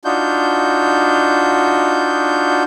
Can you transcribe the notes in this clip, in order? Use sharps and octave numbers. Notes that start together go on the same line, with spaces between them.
D4 D#4 F4 F#4 G6